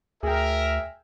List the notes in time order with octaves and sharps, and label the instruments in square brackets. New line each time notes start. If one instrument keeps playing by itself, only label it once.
[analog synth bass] D2 [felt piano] G#4 G5 [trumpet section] A#4 E5